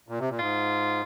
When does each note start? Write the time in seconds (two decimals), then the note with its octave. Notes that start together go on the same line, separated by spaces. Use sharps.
0.08 A#2
0.19 C3
0.29 A#2
0.38 G#2 F4